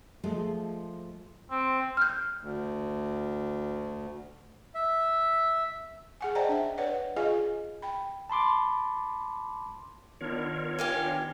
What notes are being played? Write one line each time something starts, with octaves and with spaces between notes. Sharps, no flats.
F3 G#3 A3 F4
C4
F6 G6
D2
E5
G#4 F#5 G#5
C5 D5 D#5 G5 A5 A#5
D4 E5
B4 C#5 D5 F#5
F4 G#4 D#5 F5 G#5
G5 B5
A5 B5 C6 D6
D#3 B3 D4 F4 A#4 C#5
G4 F5 G#5